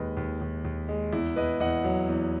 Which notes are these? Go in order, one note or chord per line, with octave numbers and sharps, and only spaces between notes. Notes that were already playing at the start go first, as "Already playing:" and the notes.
Already playing: D#2 G#3 B4 D#5
D#2
D#2
D#2
G#3
E2 E4
E2 B4 D#5
E2 D#5 F#5
F#3
E2